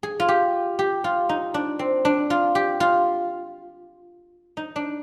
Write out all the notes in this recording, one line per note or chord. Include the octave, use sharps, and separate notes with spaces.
G#4
F4
G4
G4
F4
D#4
D4
C4
D4
F4
G4
F4
D#4
D4